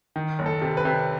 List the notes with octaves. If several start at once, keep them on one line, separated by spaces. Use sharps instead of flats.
D#3
F#1
A4
C3
B4
C3